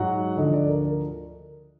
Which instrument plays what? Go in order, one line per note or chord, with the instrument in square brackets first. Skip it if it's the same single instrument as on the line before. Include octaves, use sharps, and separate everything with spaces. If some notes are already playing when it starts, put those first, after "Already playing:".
Already playing: [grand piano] G#2 F#3 F#5
D2 D3 F3 D#5
D5
A#4
A#4